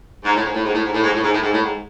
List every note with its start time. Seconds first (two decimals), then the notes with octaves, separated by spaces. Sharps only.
0.24 G#2
0.34 A2
0.44 G#2
0.54 A2
0.64 G#2
0.73 A2
0.84 G#2
0.93 A2
1.03 G#2
1.13 A2
1.22 G#2
1.32 A2
1.42 G#2
1.52 A2
1.62 G#2